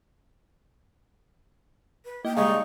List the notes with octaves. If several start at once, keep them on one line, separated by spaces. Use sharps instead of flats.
B4
A#3 E4 D#5 G5
C#3 G3 G#3 D#4 F5 C#6
D5